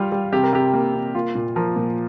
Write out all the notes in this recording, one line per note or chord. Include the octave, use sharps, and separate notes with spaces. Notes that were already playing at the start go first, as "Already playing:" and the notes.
Already playing: G3 F4
G3
C3 G4
A#4
C3 G4
A#3
C3
A#3 F4
A#2
F3 A#4
A#2